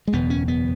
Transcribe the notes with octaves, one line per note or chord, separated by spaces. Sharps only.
G#3
F#1 E2 B2 B3
C#4
B3